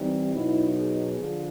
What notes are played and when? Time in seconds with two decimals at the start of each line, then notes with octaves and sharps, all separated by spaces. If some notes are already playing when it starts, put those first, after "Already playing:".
Already playing: E3 G3 C4 D#4
0.33 B2 F#3 B3 D#4 E4
0.76 G#4
1.20 D3 F3